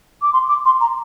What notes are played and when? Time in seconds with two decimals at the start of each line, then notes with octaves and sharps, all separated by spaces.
0.22 D6
0.33 C6
0.48 D6
0.65 C6
0.81 A#5